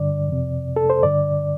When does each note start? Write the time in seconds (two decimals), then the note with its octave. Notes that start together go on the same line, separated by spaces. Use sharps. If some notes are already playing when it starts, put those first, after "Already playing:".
Already playing: G2 D3 D5
0.28 F2 C3
0.76 A4
0.90 C5
1.03 G2 D3 D5